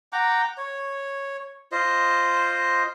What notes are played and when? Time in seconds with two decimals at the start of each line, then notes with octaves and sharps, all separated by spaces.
0.13 F#5 G5 A#5 D6
0.57 C#5
1.72 F4 C5 D#5